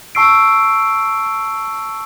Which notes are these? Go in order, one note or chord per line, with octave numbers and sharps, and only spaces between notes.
A5 C#6 E6 C7 D7